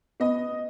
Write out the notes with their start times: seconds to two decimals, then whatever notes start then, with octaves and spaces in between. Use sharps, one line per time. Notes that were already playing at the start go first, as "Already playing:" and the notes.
0.20 B3 D#5